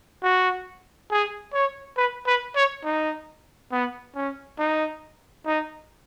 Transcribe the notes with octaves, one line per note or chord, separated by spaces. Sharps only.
F#4
G#4
C#5
B4
B4
C#5
D#4
B3
C#4
D#4
D#4